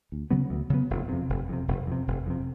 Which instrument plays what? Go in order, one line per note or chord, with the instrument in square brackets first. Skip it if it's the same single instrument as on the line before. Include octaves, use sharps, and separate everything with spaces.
[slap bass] D2
C#3 F#3 B3
D2
C#3 F#3 B3
F1
F2 C3
F1
F2 C3
F1
F2 C3
F1
F2 C3